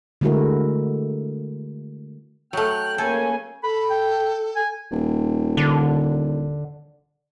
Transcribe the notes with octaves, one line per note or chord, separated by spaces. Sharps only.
D3 G#3 A3 E4 F#4 A#4
F#3 A3 G5 F6 F#6
C#3 A#3 A4 G#5
A4 B5
G5
G#5
D#1
D3